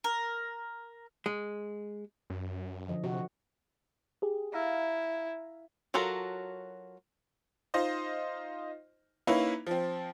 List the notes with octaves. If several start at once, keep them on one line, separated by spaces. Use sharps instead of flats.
A#4
G#3
F#2
D3 F3 D#5
C3 F#4
G4 G#4
E4 E5 F5 A#5
F#3 F4 F#4 A4 A#4
D#4 F4 C5 D#5
A#3 C#4 D#4 E4 B4
F3 C4